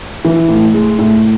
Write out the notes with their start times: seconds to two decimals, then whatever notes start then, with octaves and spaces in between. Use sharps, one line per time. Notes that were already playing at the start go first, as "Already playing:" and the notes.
0.25 E3
0.49 A2
0.74 G#3
0.99 A2